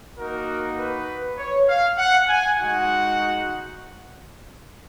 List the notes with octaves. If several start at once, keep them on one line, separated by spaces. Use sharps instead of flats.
A#3 D#4 F#4 A#4
B4
C#5
F5
F#5
G#5
G#3 D#4 F#4 F#5